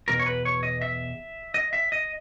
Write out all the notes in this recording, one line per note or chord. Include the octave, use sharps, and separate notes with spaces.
E2 B2 A#4
C#5
B4
C#5
D#5
E5
D#5
E5
D#5